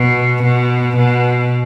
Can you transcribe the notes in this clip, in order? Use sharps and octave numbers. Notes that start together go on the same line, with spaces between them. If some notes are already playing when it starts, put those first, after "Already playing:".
Already playing: B2
B2
B2